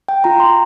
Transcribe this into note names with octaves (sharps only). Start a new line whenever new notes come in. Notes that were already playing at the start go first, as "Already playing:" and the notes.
G5
F4 A#5
C6